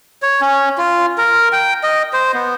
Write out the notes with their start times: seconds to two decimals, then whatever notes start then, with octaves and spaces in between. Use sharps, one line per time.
0.22 C#5
0.41 C#4
0.78 F4
1.18 A#4
1.53 G5
1.83 D#5
2.13 C5
2.34 B3